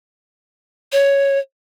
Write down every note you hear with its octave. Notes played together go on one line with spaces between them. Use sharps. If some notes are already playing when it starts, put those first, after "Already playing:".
C#5